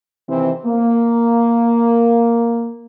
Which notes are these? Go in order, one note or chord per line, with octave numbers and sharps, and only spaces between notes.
C3 D#3 E3 C4
A#3